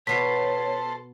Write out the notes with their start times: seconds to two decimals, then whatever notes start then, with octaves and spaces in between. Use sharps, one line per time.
0.07 B2 B3 A4 C5 C#5 B6 C7